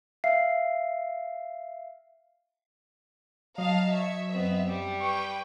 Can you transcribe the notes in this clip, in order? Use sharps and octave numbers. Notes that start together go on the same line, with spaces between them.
E5 F5 C7
F#3 D#5 F5 A5 A#5
C#5 E5
F#2 B3 C4
G3
B4 G5 C#6